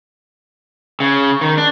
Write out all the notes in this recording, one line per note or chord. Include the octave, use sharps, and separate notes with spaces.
C#3
D#3
D4